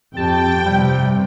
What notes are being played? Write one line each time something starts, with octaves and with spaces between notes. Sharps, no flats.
F2 G4 G5 A5
G2 C3 G3